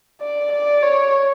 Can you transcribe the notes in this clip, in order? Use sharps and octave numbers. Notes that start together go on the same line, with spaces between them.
D5
D5
C#5